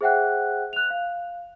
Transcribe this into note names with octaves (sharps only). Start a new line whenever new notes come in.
G#4 C5 E5 F#5 G5 F#6
F#6 F7
F5